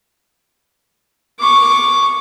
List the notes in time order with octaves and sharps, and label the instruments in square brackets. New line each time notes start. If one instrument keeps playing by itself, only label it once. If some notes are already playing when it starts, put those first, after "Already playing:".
[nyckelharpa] C#6 D6